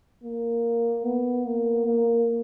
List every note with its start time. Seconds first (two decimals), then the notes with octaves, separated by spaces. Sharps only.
0.23 A#3
1.05 B3
1.45 A#3
1.86 A#3